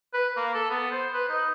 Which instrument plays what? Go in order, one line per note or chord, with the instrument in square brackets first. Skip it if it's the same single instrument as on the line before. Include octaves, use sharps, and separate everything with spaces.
[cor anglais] B4
A#3
A4
B3
C5
B4
D#4